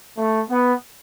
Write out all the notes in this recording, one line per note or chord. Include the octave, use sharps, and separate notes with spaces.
A3
B3